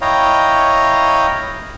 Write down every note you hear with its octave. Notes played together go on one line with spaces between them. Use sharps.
E4 C#5 D#5 F5 G5 A#5